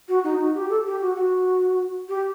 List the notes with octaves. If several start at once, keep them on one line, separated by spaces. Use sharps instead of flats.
F#4
D#4
F#4
G4
A4
G4
F#4
F#4
G4